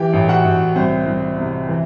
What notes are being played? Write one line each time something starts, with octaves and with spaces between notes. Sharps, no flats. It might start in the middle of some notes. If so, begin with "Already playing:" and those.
Already playing: E3 G4 G5
A1
F#4 F#5
A1
C2 C4 C5
C2
C3
E3